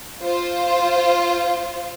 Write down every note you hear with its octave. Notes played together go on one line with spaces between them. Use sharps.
F4 C5